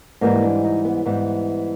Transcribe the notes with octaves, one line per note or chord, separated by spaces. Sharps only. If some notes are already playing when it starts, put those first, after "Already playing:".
G#2 E3 G3 A#3
D4
D#4
B3
G#2 E3 G3 B3